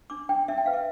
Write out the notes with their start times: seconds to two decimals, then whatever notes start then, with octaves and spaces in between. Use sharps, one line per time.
0.10 D4 D6
0.29 D4 G5
0.48 D4 E5
0.58 G5
0.66 B4 F5
0.74 E5